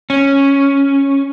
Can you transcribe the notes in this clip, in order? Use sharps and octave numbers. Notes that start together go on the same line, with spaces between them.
C#4